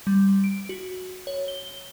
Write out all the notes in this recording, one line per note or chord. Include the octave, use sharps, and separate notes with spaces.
G3
D7
F#4
C#5
G7